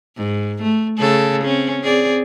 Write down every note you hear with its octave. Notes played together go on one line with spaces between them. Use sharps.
G#2
A3
C#3 A3 A4
C4 C#4
C4 G#4 D5